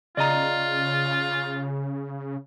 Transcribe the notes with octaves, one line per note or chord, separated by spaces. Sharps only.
C#3 F4 D5 D#5 A#5